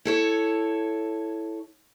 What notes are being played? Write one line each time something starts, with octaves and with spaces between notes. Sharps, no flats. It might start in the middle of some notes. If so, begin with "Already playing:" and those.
E4 A4 C#5